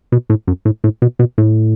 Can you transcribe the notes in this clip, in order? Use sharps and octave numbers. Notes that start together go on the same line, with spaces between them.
B2
A2
F#2
A2
A2
B2
B2
A2